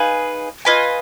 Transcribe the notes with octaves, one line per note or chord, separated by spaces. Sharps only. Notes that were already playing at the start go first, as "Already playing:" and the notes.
Already playing: D#4 G#4 B4 F5
F4 B4 D#5 G#5